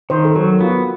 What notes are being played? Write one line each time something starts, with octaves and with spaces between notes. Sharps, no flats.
D#3 C5
A4
F#3 A#4
B3 F4